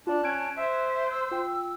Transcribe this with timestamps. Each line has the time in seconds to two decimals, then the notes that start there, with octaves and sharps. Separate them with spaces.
0.07 D4 F4 D5 A5
0.23 C#4 F#6 G#6 D7
0.56 C5 E5
1.10 E6
1.31 F4 G5